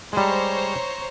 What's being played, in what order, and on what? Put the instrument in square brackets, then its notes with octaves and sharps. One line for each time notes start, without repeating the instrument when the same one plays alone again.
[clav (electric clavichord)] G3 G#3 [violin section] C5 C#5 A#5